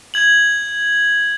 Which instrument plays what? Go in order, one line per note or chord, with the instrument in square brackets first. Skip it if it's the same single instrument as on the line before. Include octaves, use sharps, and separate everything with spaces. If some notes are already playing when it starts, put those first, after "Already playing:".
[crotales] G#6 F#7